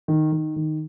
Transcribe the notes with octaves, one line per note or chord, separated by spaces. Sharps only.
D#3
D#3
D#3